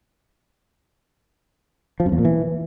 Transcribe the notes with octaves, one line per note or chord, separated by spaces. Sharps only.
F3
F#2
E2
A#2
E3